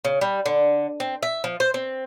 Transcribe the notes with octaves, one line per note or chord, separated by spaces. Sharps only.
C#3
G3
D3
C4
E5
F3
C5
C4